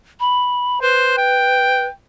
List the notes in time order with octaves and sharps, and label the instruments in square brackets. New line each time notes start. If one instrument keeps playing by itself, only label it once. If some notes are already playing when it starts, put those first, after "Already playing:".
[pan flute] B5
[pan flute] B4 [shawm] C5
[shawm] G5